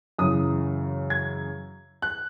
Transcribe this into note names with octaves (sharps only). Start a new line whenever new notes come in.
F#2 C#3 E3 D#6
G#6
F#6